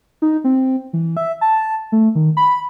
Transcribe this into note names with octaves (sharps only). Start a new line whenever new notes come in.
D#4
C4
E3
E5
A5
A3
D#3
B5